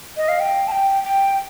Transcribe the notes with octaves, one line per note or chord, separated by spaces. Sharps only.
D#5
F5
G5
A5
G5
G5